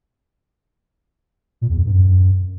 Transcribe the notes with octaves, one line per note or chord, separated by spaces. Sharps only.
A#2
E2
F2
G2
F#2